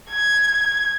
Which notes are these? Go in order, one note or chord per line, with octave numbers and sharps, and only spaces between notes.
G#6